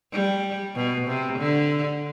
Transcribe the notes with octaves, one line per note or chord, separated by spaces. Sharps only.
G3
B2
C3
D3